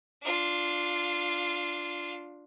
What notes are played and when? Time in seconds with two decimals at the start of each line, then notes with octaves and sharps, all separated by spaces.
0.22 D4 F4